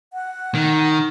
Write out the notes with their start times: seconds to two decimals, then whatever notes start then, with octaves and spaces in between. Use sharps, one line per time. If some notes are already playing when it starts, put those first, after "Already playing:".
0.13 F#5
0.55 D#3